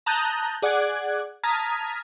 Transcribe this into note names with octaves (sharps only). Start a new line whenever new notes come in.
A5 A#5 D#6 F#6 G6
G#4 D5 F#5 D6 F#6 G#6
A5 A#5 D#6 F6 G#6 B6